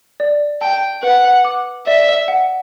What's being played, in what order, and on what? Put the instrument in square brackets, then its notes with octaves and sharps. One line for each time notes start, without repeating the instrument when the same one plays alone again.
[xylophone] D5
[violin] G5 [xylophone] A5
[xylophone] B4 [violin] F#5
[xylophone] D6
[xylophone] D5 [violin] E5
[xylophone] F#5